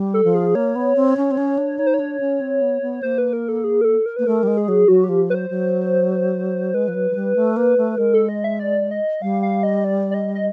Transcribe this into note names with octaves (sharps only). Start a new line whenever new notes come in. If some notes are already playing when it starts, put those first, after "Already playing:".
Already playing: G3
A4
F3
G#4
A#3 C#5
B3
C4
C#4
C4
C#4
D4
D#4 C#5
C5
C#5
D4
C#4
C4
B3
B3
A#3 C5
B4
A#4
A4
G#4
A#4
A4
A#4
A#3 B4
A3 A#4
G3
G#3
G#4
F#3
F#3 F#4
G4
F3
F#3 B4 C5
F#3
G#3 B4
F3
F#3
F#3
G3
A3
A#3
A3
G#3 A#4
A4
D#5
E5
D5
D#5
G3 F5
F5
D#5
D5
D5
D#5
D#5